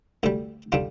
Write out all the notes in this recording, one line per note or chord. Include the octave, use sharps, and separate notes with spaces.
D2 D3 G3
D3 G3 D4 F4